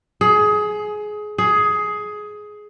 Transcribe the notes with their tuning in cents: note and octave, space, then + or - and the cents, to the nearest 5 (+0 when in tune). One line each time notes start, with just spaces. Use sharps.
G#4 +20
G#4 +15